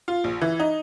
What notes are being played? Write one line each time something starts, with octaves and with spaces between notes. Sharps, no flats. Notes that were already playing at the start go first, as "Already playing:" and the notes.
F4
A#1
E3
D#4